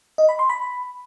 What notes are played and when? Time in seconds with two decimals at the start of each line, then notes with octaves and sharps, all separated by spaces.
0.18 D#5
0.29 B5
0.39 C6
0.49 B5